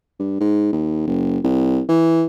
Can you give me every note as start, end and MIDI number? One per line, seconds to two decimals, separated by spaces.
0.19 0.39 43
0.40 0.72 44
0.72 1.04 39
1.07 1.39 30
1.44 1.81 36
1.89 2.26 52